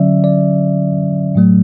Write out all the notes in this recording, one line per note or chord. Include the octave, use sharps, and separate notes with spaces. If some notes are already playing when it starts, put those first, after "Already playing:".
Already playing: D3 F#3 C#4 D5 E5
D5
A2 F#3 A3